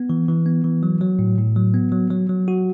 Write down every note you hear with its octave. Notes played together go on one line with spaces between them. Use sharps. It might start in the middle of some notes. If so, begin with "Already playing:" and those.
Already playing: B3
E3
E3
B3
E3
F#3
F#3
A2
A2
F#3
B3
F#3
F#3
F#3
F#4